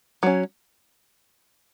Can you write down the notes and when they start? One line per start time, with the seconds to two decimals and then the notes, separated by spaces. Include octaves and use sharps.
0.23 F#3 C#4